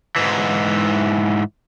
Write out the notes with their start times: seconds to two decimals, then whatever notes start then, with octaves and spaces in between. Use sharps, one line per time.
0.16 G#2 E3